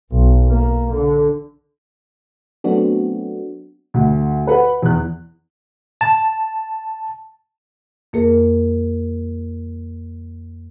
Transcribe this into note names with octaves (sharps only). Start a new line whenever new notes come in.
B1
A#3
D3
F#3 A3 B3 C4 D4 F#4
D2
B4 F#5
E2 F#6
A5
F2 A#3 G#4 A#4